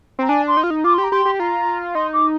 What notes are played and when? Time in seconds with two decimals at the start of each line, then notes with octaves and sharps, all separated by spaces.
0.19 C4 A#5
0.29 D4 G#5
0.47 C6
0.57 D#4
0.64 F4
0.70 D#4
0.84 F4 D6
0.94 G4 C6
1.04 A#5
1.12 G4 C6
1.25 G4
1.39 F4 A#5
1.94 D#4 C6
2.13 D6